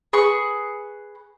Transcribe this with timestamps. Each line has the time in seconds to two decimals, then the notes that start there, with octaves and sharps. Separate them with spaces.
0.13 G#4 B4 C#6